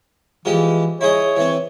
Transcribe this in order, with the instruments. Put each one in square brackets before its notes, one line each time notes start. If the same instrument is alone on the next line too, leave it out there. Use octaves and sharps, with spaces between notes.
[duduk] E3 [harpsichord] F3 G#3 G4
[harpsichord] E4 G#4 D#5 [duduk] C#5
[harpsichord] E3 C4